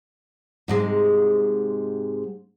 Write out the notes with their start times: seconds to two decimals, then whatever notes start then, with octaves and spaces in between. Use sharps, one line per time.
0.68 G#2 C3 G#3